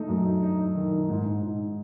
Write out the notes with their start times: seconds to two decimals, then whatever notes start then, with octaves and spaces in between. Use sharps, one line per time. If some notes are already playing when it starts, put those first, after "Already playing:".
Already playing: A3 D#4
0.09 F#2
0.25 D#4
0.42 D#4
0.59 D#4
0.76 D#3
0.92 D#4
1.09 G#2
1.25 G#2
1.42 G#2